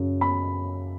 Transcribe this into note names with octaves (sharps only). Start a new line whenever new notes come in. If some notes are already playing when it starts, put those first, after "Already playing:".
Already playing: F#2 C#3
B5